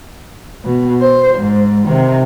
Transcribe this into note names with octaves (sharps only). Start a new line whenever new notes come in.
B2
C5
G#2
C3 D#3